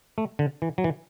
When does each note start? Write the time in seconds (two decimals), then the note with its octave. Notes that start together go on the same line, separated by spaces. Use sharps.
0.18 A3
0.39 D3
0.62 E3
0.78 F#3
0.84 E3